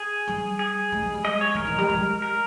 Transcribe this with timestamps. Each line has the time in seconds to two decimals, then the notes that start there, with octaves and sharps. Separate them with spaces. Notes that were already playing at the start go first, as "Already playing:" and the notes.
Already playing: G#4
0.27 G3
0.59 G#4
0.92 G#3
1.03 G#3
1.14 G3
1.24 G#3 D#5
1.41 C#5
1.55 D#3 A#4
1.67 E3
1.78 G3
1.89 G#3
2.22 A#4